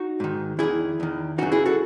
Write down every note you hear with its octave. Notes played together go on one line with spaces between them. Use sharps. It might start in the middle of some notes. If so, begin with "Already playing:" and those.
Already playing: D#4 F#4
G#2 D#3
E2 D#3 E4 G#4
E2 D#3
F#2 C#3 E3 D#4 F#4
E4 G#4
F#4 A4